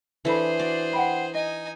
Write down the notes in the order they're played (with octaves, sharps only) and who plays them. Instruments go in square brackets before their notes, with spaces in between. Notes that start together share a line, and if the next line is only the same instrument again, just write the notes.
[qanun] E3 D4 [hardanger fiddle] G#4 C5 [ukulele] A4 B5
[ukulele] F#4 [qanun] D5
[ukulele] F#5 G5 B5
[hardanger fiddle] D#4 G#5 [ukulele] D#5